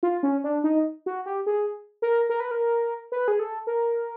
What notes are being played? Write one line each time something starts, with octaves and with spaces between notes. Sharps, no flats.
F4
C#4
D4
D#4
F#4
G4
G#4
A#4
A#4
B4
A#4
B4
G#4
A4
A#4